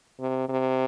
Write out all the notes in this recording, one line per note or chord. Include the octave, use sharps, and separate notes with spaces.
C3
C3